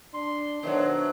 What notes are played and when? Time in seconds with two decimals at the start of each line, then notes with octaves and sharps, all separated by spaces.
0.14 D4 C6
0.63 B2 D#3 F#3 D4 C5 E5